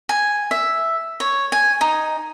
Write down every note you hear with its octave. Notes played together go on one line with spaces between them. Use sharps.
G#5
E5
C#5
G#5
D#4